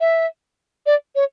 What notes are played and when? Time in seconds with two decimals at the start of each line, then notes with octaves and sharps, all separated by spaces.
0.01 E5
0.86 D5
1.16 C#5